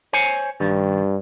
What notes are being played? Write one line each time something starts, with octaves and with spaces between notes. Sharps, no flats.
C5 C#5 G#5
G2 D#3